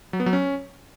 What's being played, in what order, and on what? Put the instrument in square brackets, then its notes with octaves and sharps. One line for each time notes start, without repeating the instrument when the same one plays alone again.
[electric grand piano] F#3
B3
F#3
C#4